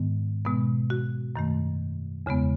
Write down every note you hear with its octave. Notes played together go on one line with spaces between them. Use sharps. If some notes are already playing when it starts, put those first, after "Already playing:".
Already playing: G#2 D#3 G#3 B3
B2 G#3 B3
F#4
F#2 D#3 A3
E2 C#3 G#3 B3